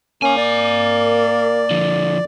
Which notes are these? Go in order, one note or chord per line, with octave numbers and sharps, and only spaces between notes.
A#3 C#4 A#4 G#5
D5
D3 F3